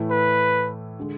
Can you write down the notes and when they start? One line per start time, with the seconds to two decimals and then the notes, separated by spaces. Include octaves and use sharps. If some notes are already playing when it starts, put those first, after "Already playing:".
Already playing: A2 E3 A3 E4
0.11 B4
0.99 D3 G#3